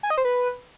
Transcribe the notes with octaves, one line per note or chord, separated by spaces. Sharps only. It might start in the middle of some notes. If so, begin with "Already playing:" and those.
G#5
D#5
C5
B4